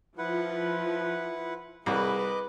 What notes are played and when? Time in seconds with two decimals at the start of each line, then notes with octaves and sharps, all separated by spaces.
0.18 F3 E4 B4 F#5
1.86 C2 G#4 B4 D#5 D6